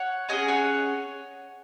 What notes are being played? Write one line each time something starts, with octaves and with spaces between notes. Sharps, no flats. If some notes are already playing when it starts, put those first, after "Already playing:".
Already playing: C#5 F#5
C#4 G#4 D#5 G#5
C#5 F#5